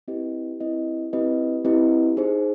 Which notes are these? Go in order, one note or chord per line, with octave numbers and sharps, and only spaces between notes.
C4 E4 G4 B4 D#5
C4 E4 G4 B4 D#5
C4 E4 G4 B4 D#5
C4 E4 G4 B4 D#5
D#4 G#4 C5